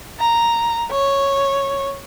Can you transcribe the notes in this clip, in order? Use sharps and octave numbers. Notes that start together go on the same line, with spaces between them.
A#5
C#5